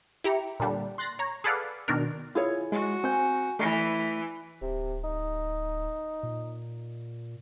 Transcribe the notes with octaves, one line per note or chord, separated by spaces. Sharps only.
E4 G4 A#5 C#7
A#2 D3 G3 D4
C6 F#6 A6 A#6
C#5 A#5
G#4 A4 B4 D5 F5 F#5
B2 D#3 D4 A#4
E4 F4 G#4 C#5
G#3 F#4
C4 G#5 G6
E3 A3 D5
D1 C3
D#4
A#2